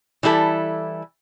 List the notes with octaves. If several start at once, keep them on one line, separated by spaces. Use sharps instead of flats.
E3 G3 E4 A4